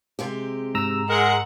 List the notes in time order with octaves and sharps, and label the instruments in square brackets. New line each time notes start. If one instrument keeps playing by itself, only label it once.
[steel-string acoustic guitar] C3 G#3 G4
[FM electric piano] G#2 A#5 E6
[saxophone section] G#3 A#4 [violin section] F#5